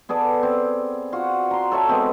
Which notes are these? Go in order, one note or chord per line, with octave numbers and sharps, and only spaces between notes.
B3 G#4 A4 D5
C4
F4 F#4 F#5
A#5 C6
A4 C#5 E5
G#3 B3 C4 E5